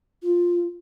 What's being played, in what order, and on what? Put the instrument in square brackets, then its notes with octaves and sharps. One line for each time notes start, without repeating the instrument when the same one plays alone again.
[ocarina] F4